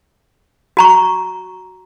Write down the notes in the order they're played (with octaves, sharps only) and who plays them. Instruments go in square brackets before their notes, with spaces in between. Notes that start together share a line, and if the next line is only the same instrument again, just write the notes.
[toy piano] F#4 A#5 C#6